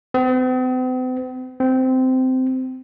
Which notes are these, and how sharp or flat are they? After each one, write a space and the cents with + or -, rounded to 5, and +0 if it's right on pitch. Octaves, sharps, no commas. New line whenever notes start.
C4 -45
C4 -15